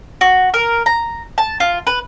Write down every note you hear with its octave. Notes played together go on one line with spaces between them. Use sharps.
F#4
A#4
A#5
A5
F4
B4